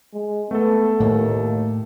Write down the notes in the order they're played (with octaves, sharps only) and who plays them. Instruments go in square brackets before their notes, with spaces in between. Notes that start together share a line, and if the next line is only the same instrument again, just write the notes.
[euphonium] G#3
[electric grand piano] A3 A4 [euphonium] B3
[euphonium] D#2 [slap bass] A2 A#3